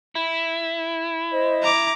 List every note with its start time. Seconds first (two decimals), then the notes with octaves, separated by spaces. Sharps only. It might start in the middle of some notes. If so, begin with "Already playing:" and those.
0.15 E4
1.32 C5 D#5
1.63 A#5 D6